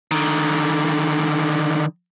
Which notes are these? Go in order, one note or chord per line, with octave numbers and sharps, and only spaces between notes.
D3 D#3